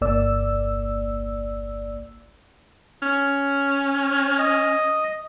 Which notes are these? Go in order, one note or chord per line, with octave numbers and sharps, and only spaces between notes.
G1 C2 A#3 D5 E6
C#4
D#5